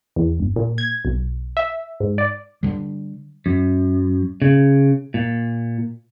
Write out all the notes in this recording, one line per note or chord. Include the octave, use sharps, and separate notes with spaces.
E2
G1
A#2
G#6
B1
E5
G#2
D5
D3 G3
F#2
C#3
A#2